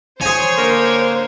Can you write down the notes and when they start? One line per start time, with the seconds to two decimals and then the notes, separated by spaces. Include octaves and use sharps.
0.21 G#4 C5 C#5 G#5
0.56 D3 A#3